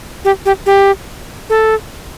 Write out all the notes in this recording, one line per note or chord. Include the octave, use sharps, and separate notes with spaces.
G4
G4
G4
A4